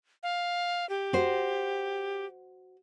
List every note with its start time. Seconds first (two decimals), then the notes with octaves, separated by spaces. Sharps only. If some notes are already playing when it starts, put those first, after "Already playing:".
0.23 F5
0.89 G4
1.13 F#4 C5